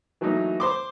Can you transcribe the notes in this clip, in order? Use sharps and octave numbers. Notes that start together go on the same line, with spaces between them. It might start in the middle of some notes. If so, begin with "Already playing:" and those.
E3 F#3 A3 A#3 D#4
C5 C6 D6